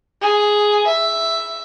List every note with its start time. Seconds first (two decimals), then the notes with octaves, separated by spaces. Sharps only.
0.21 G#4
0.87 E5